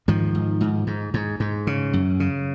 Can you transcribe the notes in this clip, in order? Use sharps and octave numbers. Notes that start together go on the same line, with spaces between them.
G#2 D#3 F3
G#2
G#2
G#2
G#2
G#2
C#3
F#2
C#3